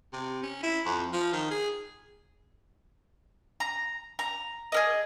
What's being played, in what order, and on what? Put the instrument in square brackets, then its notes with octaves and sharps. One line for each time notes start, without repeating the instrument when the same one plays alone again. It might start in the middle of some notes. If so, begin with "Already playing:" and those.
[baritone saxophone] C3
C#4
E4
F2
F3
D#3
G#4
[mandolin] A#5
A#5
G#4 A#4 D#5